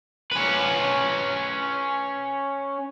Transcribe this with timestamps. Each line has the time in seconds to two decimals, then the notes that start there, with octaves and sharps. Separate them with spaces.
0.31 C#4 B4